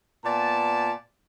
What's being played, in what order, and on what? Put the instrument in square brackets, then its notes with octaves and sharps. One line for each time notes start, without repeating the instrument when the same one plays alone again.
[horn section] A#2 B3 D5 A5